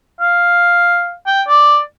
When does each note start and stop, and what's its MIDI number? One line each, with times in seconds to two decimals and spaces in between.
0.20 1.12 77
1.26 1.42 79
1.47 1.79 74